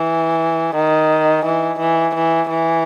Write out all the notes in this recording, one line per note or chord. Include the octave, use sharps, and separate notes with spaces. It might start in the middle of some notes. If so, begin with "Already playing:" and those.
Already playing: E3
D#3
E3
E3
E3
E3